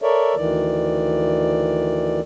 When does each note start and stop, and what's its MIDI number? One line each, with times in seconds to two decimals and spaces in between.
0.02 0.35 69
0.02 0.35 70
0.02 0.35 73
0.02 0.35 74
0.02 0.35 76
0.36 2.20 38
0.36 2.20 51
0.36 2.20 52
0.36 2.20 74